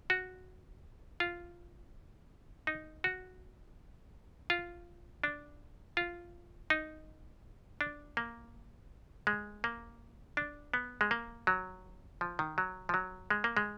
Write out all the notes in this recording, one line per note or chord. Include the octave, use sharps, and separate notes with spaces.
F#4
F4
D#4
F#4
F4
D4
F4
D#4
D4
A#3
G#3
A#3
D4
B3
G#3
A#3
F#3
F3
D#3
F#3
F3
F#3
G#3
A#3
G#3